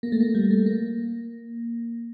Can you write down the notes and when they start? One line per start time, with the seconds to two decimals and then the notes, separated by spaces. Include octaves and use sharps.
0.03 A#3
0.12 A3
0.20 A#3
0.35 G3
0.51 A3
0.66 A#3